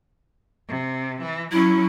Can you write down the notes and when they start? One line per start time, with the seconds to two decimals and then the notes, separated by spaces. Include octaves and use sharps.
0.68 C3
1.21 E3
1.52 F#3 C#4 E4